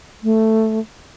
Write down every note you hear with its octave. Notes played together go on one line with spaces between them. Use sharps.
A3